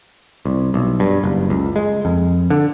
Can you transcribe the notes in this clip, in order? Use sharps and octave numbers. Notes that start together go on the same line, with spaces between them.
C2
B1
G2
F#1
C#2
G#3
F2
D3